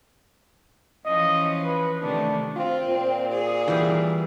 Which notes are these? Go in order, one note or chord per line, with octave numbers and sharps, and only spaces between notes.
E3 F3 C#4 D#5
B4
C3 D#3 A3 D4
C4 F4
A#2
G#4
E3 G3